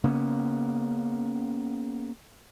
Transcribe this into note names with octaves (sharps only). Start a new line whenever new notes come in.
C#3 A#3 B3 C#4